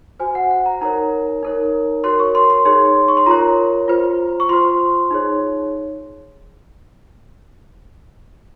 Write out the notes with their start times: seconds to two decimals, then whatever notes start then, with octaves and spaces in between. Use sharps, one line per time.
0.20 F#4 C5 G#5
0.35 F#5
0.51 F#5
0.66 A#5
0.81 D#4 A#4 C#5 A#5
1.43 D#4 A#4 C#5
2.04 F#4 A#4 C#5 C6
2.19 C#6
2.35 C6
2.50 C6
2.65 D#4 G#4 C#5 C6
3.08 C#6
3.17 C6
3.26 F4 A#4 C#5 A#5
3.88 F4 C5
4.40 C#6
4.49 F4 C5 C6
5.11 D#4 G#4 C#5